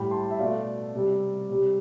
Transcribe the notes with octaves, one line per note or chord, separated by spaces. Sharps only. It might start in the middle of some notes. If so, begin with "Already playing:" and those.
Already playing: A2 G3 G5 B5
A5 C6
E5
B2 A3 D5 F5
C3 G3
C3 G3